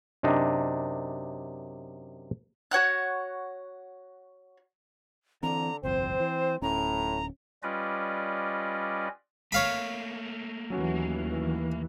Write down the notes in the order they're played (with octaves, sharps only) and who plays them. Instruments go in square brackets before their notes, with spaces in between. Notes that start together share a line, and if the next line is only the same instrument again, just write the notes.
[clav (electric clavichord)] F#2 C3 D4 D#4
[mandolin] F#4 C#5 F#5 F#6
[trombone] D3 [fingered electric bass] E3 C4 [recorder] A#5
[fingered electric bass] G1 C2 F2 [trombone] C4 [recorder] C5
[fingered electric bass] E3
[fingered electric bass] D1 C#4 [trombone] A2 [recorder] A#5
[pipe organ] G3 C#4 F4 B4 D5 D#5
[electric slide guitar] A3 A#3 [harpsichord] C#5 F5 B5
[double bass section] D#2 E3 [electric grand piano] F#3 C#4 F#4